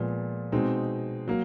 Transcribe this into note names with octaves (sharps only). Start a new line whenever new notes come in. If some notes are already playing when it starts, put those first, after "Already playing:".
Already playing: A#2 F3 G#3 B3
B2 G#3 C4 D#4
F#3 A#3